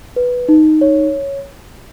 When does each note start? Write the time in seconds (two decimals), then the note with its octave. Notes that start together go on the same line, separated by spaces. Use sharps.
0.16 B4
0.49 D#4
0.81 C#5